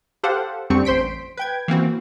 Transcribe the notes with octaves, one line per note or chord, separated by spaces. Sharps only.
G4 A4 C5 F5 F#5
F2 D3 G3 C4 C#6
A1 C5 C6 B6 D7
B4 G5 G#6
E3 A#3 C4 F#4